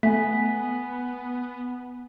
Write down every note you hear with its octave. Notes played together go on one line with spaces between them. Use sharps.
A3 B3 G#5 B6